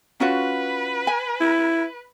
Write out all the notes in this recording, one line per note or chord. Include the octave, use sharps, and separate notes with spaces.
C#4 F4 F#4 B4
G#5
E4